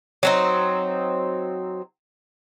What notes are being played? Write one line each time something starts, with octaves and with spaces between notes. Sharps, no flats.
F#3 C4 D#4